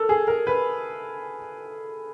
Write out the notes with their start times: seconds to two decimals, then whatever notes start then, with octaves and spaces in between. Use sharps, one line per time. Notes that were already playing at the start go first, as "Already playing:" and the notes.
Already playing: A4 A#4
0.09 G#4
0.28 A#4
0.47 B4